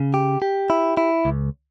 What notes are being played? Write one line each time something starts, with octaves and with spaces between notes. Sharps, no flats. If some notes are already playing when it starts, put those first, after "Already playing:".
Already playing: C#3
G4
G4
E4
E4
C#2